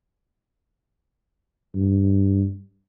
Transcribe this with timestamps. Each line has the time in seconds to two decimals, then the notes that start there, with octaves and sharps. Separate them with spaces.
1.75 G2